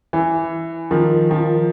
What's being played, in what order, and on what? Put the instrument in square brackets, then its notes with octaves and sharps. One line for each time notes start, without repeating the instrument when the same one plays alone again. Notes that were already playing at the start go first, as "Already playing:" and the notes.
[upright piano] E3
D#3 F3
D#3 F3